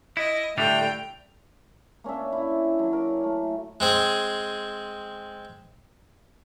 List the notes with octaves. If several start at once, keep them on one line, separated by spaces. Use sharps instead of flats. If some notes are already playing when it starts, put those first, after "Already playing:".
E4 D#5
A2 D3 G3 A3 G5 F7
A#3 C#4 D4 E5
E4
F#3
A#4
A3
G#3 C4 G#4